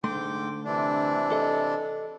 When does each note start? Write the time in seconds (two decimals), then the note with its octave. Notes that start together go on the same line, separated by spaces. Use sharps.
0.04 G#2 D3 A3 G5 C6 D6
0.65 C3 E3 D4
1.32 A4 D#5